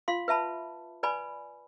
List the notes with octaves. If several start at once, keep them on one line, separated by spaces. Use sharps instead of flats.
F4 F5 C6
B4 E5 A5 B5
B4 D5 G#5 B5